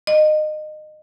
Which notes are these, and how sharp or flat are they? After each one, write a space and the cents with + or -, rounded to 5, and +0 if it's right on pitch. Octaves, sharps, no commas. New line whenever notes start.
D#5 -25